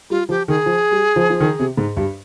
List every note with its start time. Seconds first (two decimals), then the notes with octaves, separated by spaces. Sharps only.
0.10 G3 F4
0.29 F3 G4
0.48 D#3 G#4
0.66 F3
0.91 G3
1.16 F3
1.30 F3
1.40 D#3
1.59 C3
1.77 G#2
1.97 G2